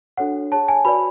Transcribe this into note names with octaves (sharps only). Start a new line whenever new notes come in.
D4 F#4 A4 C#5 F#5
G#4 C#5 A5
G#5
F#4 B4 D5 B5